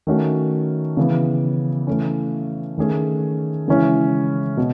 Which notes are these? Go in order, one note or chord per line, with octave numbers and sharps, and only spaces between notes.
D#3 A3 C#4 F#4
C#3 E3 B3
E3 A3 C#4
D#3 A3 C#4 G#4
C#3 E3 G#3 C#4 E4
B2